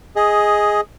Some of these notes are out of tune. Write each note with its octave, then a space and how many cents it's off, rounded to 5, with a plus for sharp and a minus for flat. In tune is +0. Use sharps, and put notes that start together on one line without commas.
G#4 +0 D#5 +10